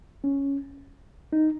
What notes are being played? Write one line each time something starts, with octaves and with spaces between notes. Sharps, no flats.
C#4
D#4